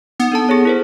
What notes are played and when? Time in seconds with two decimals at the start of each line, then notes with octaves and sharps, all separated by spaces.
0.20 B3 D#4
0.32 D4 A4 A5
0.49 G#4 A4 C#5
0.65 E4 A#4 C5